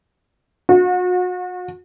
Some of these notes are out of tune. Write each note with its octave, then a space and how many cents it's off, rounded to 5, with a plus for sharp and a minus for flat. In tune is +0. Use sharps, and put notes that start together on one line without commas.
F#4 -40